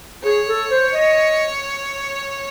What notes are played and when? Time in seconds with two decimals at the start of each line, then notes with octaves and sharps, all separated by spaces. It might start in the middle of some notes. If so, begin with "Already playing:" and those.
0.24 G#4 C#5
0.48 A4
0.71 C5
0.93 D#5